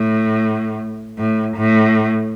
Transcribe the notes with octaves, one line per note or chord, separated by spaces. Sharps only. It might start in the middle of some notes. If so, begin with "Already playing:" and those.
Already playing: A2
A2
A2